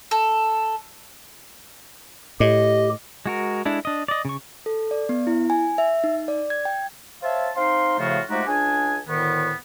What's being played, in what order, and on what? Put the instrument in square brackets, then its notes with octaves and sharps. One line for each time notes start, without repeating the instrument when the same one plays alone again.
[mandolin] A4
[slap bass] A2 [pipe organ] G4 [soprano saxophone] D#5
[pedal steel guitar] G#3 F#4 A#4
G#3 D4 E4 A4
D4 D#5
D5 D#5
C#3 C#6
[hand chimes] A4
D5
B3
E4
G#5
E5
D#4
D5
G#6
G5
[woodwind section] C5 C#5 E5 F5 A5
C4 D#4 F5 C6
A2 C#3 F3 A3 F4 F#4
F3 G#3 A3 D#4 F#4 G4
C#2 D4 G#4 G#5
D2 A2 D3 D#3 B3